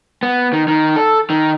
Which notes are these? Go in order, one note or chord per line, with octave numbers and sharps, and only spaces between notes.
B3
D#3
D#3
A4
D#3